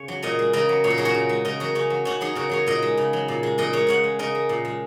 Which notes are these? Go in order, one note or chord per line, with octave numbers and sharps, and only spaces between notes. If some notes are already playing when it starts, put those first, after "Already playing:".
Already playing: C#3 C#5
F#3
A#2 A#4 D#5
G#3
C#3 A#4 D#5
F#3
A#2 C#5
A#4
F#3 G#4
F#4 A#4
C#3
G#3
C#3 A#4 D#5
F#3 F#4 A#4
C#3 C#4
F#3
C#3 C#4 F#4
F#3 D#4 G#4
C#3 F#4 A#4
F#3 G#4 C#5
A#2 A#4 D#5
G#3
C#3
F#3
A#2
G#3
A#2 A#4 D#5
G#3 G#4 C#5
C#3 C#5 F#5
G#3
C#3 A#4 D#5
G#3
A#2
G#3